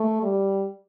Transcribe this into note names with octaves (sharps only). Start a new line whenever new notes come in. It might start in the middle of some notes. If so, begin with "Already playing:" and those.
Already playing: A3
G3